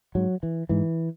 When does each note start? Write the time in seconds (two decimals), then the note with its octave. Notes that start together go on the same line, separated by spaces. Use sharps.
0.15 G#2 F#3
0.43 E3
0.69 G#2 E3